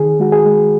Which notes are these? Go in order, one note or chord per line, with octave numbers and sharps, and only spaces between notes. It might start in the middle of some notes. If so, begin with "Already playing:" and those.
Already playing: D#3 G#4
G#3 F#4
G#4
G#3